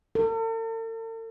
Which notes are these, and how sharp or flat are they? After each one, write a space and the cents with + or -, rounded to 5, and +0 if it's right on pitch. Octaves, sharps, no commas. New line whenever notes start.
A4 +45